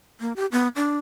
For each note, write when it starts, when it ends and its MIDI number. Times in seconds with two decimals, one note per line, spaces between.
0.20 0.33 58
0.36 0.46 67
0.52 0.68 59
0.76 0.98 62